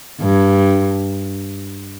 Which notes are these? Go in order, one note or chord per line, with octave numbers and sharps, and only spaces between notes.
G2